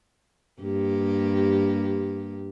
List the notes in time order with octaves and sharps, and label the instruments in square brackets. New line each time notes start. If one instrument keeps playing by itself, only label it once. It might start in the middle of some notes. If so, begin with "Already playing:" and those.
[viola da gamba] G2 A#3 G4